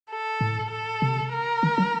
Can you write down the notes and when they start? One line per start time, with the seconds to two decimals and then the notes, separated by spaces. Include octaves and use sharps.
0.11 A4
0.41 A2
0.72 A4
1.02 C3
1.33 A#4
1.63 D#3
1.78 F#3